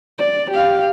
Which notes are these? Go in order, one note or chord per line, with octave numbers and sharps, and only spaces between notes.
D5
G4 F5